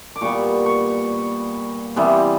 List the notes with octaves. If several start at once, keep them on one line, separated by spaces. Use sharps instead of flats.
D6
A#2 G3 B3 C#6
C#6
C3 E3 G3 B3